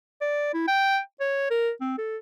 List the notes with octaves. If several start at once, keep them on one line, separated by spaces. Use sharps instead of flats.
D5
E4
G5
C#5
A#4
C4
A4